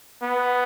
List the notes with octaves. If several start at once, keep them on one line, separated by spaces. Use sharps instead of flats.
B3